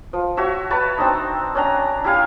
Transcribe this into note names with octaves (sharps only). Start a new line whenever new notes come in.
F3
F#4 C#5 E5 A5
B4 C#5 A5 B5
C4 D4 D#4
C#4 D4 A#5
E4 G4 F5 G#5